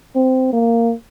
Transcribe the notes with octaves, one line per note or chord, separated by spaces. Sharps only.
C4
A#3